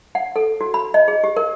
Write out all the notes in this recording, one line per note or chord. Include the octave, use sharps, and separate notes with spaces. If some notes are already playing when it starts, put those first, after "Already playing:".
F#5
A4
F#4
B5
D#5
G#4
G4
A#4